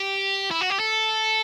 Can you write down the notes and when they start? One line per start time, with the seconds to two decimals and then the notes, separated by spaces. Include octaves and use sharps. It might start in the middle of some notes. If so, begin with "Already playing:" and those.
Already playing: G4
0.51 E4
0.61 F#4
0.70 G4
0.79 A4